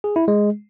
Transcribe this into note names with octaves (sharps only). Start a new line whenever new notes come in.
G#4
E4
G#3